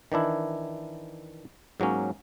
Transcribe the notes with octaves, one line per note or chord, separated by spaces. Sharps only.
D#3 E3 D4 E4
G#2 F#3 A#3 C#4